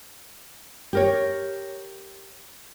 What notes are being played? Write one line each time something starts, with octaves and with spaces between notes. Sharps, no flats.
G4 A#4 C#5